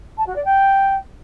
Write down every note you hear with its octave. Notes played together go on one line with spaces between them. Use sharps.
A5
F#4
D5
G5